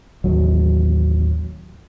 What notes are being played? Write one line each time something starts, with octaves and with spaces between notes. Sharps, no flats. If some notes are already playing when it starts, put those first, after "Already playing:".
A1 D#2 F#3